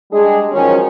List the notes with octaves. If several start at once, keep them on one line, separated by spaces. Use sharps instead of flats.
G3 G#3 D4 G#4
D#3 F3 F#3 C#4